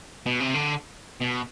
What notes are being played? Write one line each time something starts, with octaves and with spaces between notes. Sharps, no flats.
B2
C3
D3
B2